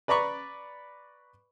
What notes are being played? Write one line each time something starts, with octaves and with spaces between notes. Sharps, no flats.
B4 D5 A#5 B5 C#6